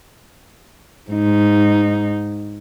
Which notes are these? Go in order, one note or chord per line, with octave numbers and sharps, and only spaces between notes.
G#2 D#4